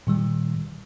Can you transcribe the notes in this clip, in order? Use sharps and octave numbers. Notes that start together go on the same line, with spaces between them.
A#2 D#3 G3